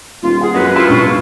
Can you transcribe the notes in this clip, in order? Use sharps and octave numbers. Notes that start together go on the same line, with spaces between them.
D#1 F4
G#4 F#5
F#2 C3 G#3 B3 B4
C3 E4 F4 G5 C6
E1 G2 D4 C#6
B1